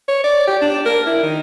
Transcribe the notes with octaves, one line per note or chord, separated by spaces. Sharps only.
C#5
D5
G4
D4
A#4
E4
D#3